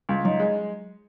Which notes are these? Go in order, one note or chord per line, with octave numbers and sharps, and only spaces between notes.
C#2
F#3 D#4
G#3